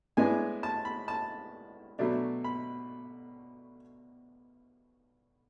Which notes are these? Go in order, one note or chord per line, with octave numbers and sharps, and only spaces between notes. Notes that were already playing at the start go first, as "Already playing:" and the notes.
A2 G#3 B3 D4 G#5
A5
B5
A5
B2 F#3 A3 D4
B5